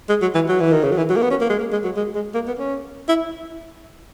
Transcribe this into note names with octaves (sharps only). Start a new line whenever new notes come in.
G#3
F#3
E3
F#3
E3
D#3
C#3
F#3
E3
F#3
A#3
B3
C#4
A#3
G#3
A#3
G#3
F#3
G#3
G#3
A#3
B3
C#4
E4